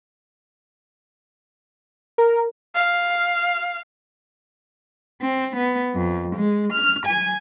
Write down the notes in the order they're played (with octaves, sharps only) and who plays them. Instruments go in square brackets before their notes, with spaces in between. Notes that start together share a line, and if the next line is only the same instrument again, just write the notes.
[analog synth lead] A#4
[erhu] F5
[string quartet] C4
B3
F2
G#3
F6
G#5